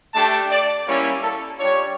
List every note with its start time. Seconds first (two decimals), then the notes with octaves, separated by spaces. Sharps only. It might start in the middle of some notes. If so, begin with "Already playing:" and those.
0.14 A3 D4 G4 A5
0.50 D5
0.86 G3 A#3 C#4 E4 C#5
1.22 A4
1.58 G3 D4 F4 C#5